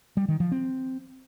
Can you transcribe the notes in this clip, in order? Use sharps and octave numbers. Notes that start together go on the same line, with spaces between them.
G3
D#3
F3
C4